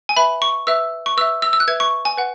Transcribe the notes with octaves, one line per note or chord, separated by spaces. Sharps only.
G#5
B4 E5 B5
C#6
B4 E5 E6
C#6
B4 E5 E6
E6
E6
F#6
B4 E5 G#6
C#6
G#5
B4 F#5